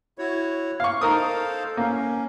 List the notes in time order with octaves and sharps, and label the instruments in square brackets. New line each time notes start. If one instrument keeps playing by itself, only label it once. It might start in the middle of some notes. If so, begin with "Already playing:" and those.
[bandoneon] E4 F#4 C#5
[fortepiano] F5 C#6
[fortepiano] D#4 A#4 D#6 [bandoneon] A4 C5 F5
[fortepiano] A#3 [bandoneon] C#4